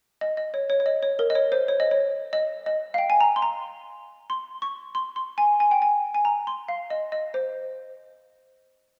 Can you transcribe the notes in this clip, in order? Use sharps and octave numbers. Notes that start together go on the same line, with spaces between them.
D#5
D#5
C#5
C#5
C#5
D#5
C#5
A#4
D#5
C#5
C5
C#5
D#5
C#5
D#5
D#5
F5
G5
G#5
A#5
C6
A#5
C6
C#6
C6
C6
G#5
G#5
G5
G#5
G#5
A#5
C6
F5
D#5
D#5
C5